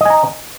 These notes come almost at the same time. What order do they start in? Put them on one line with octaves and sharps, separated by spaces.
D#5 G#5 A#5